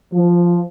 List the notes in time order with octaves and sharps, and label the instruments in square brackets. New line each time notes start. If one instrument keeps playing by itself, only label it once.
[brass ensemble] F3